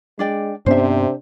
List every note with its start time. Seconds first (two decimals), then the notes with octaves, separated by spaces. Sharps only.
0.19 G#3 D4 D5 G5
0.66 G2 C3 B3 C#4 D4 C5 E5